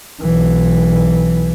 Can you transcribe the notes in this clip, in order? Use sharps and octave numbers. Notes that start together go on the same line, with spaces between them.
B1 E3